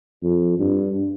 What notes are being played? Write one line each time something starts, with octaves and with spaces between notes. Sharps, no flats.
F2
G2